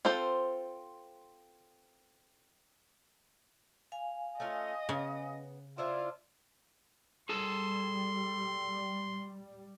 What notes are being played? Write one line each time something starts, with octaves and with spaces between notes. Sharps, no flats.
C4 F4 A4 C5
F5 G#5
A3 C#4 F4 D#5
C#3 B3
D4 E4 F4 C5 E5
G3 G#4 A4 A5 C6